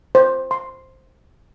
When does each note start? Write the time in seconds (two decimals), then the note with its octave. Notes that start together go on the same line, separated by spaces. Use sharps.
0.15 C5
0.51 C6